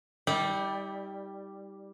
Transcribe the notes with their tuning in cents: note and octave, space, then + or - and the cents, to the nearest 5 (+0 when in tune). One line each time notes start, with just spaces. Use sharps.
G3 +0 D#4 +45